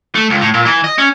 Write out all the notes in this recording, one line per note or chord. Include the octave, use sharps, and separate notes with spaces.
A3
C#2
A2
A#2
E3
D#5
C#4